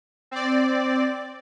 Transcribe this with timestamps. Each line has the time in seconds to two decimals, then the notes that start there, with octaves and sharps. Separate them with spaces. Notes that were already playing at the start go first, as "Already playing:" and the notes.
0.31 C4 D5